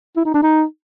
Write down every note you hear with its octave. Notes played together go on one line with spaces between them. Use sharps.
E4
D#4
D4
D#4